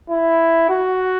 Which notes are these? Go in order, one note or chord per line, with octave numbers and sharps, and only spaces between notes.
E4
F#4